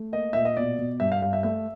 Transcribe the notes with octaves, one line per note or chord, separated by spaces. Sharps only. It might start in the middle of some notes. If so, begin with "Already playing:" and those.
Already playing: A3
A#3 D#5
A#2 E5
D#5
B2 D5
B2
G2 E5
F5
G2 F5
E5
A3 E5